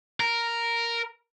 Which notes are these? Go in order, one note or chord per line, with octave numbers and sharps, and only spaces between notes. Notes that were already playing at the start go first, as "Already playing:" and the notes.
A#4